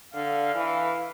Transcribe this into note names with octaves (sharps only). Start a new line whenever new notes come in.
D3 F5
E3 F5